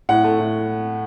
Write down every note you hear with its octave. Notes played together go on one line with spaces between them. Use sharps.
A2 F#5
A3
A2